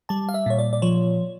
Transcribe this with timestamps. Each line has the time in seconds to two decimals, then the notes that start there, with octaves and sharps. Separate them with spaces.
0.09 G3 A5
0.29 F5
0.34 E5
0.46 A#2 C#5
0.59 D5
0.73 D5
0.82 F3 C#5